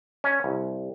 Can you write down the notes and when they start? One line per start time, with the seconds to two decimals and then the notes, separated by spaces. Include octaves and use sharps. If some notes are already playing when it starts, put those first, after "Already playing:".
0.24 C#4
0.44 C2